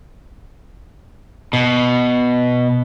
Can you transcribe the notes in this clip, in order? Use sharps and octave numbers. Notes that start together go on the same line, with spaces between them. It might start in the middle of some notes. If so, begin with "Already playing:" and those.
B2